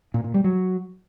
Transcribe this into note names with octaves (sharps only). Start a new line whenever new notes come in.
A#2
A#2
G3
F#3